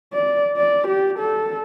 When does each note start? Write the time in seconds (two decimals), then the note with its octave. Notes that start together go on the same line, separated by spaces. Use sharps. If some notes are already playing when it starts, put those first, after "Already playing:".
0.13 D5
0.57 D5
0.88 G4
1.19 A4